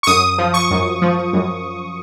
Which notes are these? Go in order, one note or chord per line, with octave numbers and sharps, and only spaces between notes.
C#6
F#2 D#6
F3
C#6
F#2
F3
F#2